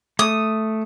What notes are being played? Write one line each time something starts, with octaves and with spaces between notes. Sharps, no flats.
A3 D#6